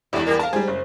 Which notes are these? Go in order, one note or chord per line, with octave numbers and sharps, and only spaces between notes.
E2 G#2 D4 E4 G4 D5
G3 G4 A#4 C#5 D5
A4 A#4 F5 A5
G3 G#3 G#4 C5
F#1